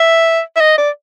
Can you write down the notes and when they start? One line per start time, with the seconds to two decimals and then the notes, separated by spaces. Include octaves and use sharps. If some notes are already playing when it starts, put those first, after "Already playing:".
Already playing: E5
0.56 E5
0.61 D#5
0.78 D5